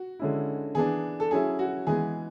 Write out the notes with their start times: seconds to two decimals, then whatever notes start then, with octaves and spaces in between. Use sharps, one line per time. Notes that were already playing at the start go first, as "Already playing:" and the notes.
Already playing: F#4
0.19 D3 G#3 C#4 E4
0.75 E3 B3 D4 G#4
1.20 A4
1.31 F#3 C#4 E4 G#4
1.59 F#4
1.87 E3 G#3 B3 G#4